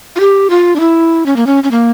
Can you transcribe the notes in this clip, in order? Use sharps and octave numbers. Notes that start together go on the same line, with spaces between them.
F4
G4
F4
D4
E4
C#4
A#3
C#4
C#4
A#3